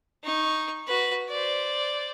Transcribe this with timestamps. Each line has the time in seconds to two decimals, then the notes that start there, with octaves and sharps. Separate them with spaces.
0.24 D#4 C#6
0.87 F#4 B4
1.29 C5 D5